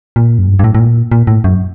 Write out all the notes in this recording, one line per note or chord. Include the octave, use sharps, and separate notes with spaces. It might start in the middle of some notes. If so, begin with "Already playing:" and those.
A#2
F#2
G2
G2
A2
A2
A#2
A#2
A2
F#2